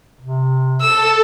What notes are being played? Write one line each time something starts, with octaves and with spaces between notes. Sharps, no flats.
C3
A4 E6